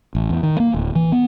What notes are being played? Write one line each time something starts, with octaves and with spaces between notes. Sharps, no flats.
A1
E2
D#3
A#3
D1
E3
B3